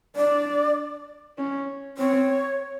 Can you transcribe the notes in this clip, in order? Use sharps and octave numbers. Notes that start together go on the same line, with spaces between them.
D4 D5
C#4
C4 C#5